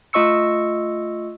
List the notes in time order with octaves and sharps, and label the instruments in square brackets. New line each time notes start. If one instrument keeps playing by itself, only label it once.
[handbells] A3 F4 D#5 C#6 E6 C#7